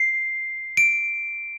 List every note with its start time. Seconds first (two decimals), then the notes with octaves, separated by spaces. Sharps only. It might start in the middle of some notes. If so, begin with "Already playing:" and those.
Already playing: C7
0.77 D7